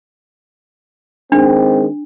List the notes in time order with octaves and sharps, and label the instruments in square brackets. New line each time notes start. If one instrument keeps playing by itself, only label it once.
[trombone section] D#3 G#3 C4 [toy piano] D4